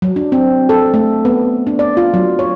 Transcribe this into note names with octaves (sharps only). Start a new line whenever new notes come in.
F#3
D4
C4
A4
A3
B3
D4
D5
F4
F#3
C#5